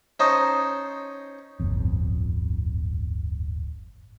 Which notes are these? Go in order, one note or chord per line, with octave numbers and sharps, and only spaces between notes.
C#4 D#4 C5 D#5 A5
D1 G1 F2